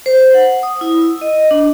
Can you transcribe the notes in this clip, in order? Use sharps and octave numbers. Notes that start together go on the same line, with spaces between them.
C5
F#5
D#6
E4
E6
D#5
D4